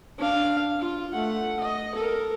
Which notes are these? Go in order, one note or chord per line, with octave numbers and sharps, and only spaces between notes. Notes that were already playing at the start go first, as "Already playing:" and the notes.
D4 F5
F4
A3 F#5
D#5
A4 A#4